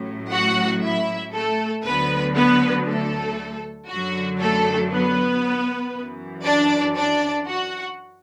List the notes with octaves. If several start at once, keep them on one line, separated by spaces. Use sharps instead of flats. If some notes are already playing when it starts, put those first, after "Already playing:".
Already playing: A1 A2 F#3
F#4 F#5
E4 E5
A3 A4
D2 D3 F#3 B3 B4
B3 B4
A3 A4
F#2 D3 F#3 F#4
A3 A4
B3 B4
F#2 E3
D4 D5
D4 D5
F#4 F#5